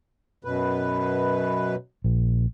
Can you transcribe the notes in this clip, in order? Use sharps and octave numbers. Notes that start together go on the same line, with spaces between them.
F#2 B2 B4
A#1